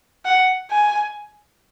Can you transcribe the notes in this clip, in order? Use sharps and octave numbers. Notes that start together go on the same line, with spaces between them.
F#5
G#5